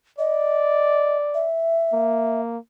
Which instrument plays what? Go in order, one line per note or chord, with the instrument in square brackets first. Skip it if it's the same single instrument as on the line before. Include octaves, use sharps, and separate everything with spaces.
[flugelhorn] D5 [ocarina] D#5
[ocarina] E5
[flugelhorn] A#3